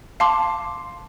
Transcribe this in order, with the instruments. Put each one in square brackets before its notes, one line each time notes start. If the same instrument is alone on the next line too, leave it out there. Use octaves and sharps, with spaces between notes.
[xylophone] F5 A5 C6 D6